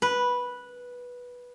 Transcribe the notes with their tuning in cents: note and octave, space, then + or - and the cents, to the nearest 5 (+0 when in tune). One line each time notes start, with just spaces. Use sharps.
B4 -10